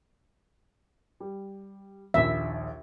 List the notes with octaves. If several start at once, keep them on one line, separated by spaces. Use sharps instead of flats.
G3
A#1 D#2 E5